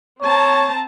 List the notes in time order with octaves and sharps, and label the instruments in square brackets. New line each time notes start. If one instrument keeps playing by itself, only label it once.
[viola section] C4 A5 A#5 [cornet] C#5